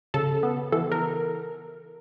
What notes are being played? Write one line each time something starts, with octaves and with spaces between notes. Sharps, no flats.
C#3 A4
B3
E3 A4
A#4